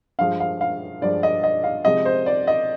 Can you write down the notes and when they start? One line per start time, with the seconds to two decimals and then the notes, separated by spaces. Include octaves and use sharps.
0.19 G2 F3 G#3 F5
0.40 F5
0.61 F5
1.02 G2 F3 G#3 D5
1.23 D#5
1.44 D#5
1.64 F5
1.85 C3 F3 G#3 D#5
2.05 C5
2.26 D5
2.47 D#5